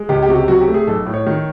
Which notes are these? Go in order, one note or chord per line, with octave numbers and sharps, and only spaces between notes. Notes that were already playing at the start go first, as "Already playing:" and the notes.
Already playing: G#3
C#2 G4
G4
C3 F#4
G4
F#3 F#4
G4
A3
G#4
B1 A4
A2
C#5
D#3